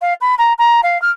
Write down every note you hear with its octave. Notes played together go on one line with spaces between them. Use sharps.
F5
B5
A#5
A#5
F5
F6